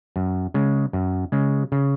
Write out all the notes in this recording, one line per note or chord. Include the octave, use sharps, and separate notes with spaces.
F#2
C#3 G#3
F#2
C#3 G#3
C#3